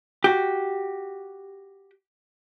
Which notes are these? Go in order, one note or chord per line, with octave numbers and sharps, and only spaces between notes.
F#4 G4